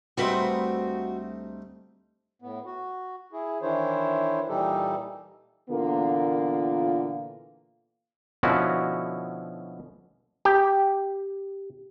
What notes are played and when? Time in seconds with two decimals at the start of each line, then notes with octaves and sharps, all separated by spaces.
0.17 D2 G3 A3 C4 D#4 F#4 B4
2.42 A2 B3
2.66 F#4
3.33 E4 G#4
3.62 D#3 E3 D4 E4 C5 C#5
4.49 A#2 E3 G3 D#4 G4 A4
5.70 A#2 D3 E3 A#3 B3 F4
8.43 B2 D3 F3 C#4 E4 F#4
10.45 G4